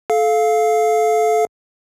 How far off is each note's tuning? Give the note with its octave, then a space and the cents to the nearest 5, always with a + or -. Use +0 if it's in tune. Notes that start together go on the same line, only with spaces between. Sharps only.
A4 -25 F5 +0